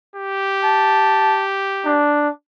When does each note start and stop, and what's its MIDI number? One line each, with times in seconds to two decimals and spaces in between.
0.16 2.06 67
0.63 1.42 81
1.85 2.28 62